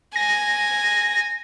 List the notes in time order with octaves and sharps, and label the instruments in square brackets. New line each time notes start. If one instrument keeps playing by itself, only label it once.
[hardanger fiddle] G#5 [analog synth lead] A#6